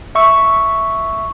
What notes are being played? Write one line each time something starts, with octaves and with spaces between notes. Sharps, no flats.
E5 C#6 E6